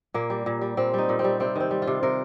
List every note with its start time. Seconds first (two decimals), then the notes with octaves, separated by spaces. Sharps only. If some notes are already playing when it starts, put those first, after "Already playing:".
0.14 A#2 A#3
0.30 G3
0.46 A#2
0.61 G3
0.77 A#2 C4
0.94 G3 D#4
1.09 A#2
1.19 C4
1.24 G3
1.40 C3 C4
1.56 D#3 C4
1.71 G3
1.82 F4
1.87 C3
2.03 C3 A#4